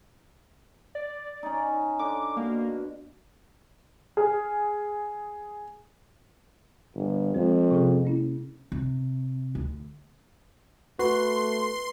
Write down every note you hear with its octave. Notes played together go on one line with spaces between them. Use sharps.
D5
C#4 D#4
D3 D6
B2 A#3
G#4 F6
G1
F2 G#3
C3 C#4 G#4
A#3 C#4 E4
C3
D2
A3 F#4 B4 C6